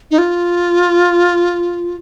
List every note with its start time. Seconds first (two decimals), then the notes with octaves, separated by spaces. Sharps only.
0.11 D#4
0.18 F4